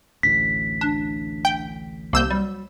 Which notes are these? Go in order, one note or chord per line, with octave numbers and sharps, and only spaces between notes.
A1 D2 A2 B6
D4
G5
C2 A#3 E6 G6
F#3 G3